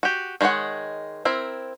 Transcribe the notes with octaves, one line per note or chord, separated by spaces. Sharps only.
F#4 G4
D#3 G#3 D4 C#5 F#5
C4 E4 A#4